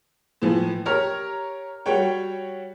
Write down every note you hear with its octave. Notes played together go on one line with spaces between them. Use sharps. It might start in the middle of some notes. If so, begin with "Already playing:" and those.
A2 E3 F3
G4 A#4 C#5 A#5 F6
G3 F#4 C#5 G5